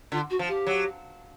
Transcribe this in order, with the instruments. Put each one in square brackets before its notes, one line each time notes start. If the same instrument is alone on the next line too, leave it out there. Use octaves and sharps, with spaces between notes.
[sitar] D3 [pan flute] F4
[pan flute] F#4
[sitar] F3
[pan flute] G4
[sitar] F#3